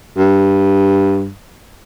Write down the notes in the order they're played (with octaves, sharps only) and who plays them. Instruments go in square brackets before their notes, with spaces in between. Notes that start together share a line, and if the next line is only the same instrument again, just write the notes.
[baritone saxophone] G2